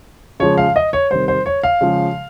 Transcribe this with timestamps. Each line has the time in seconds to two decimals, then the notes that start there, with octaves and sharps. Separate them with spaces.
0.40 C#3 F3 G#3 C#5
0.58 F5
0.76 D#5
0.93 C#5
1.11 C3 D#3 G3 C5
1.28 C5
1.46 C#5
1.63 F5
1.81 C#3 F3 G#3